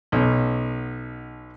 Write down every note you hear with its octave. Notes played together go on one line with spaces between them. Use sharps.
B1 B2 C#4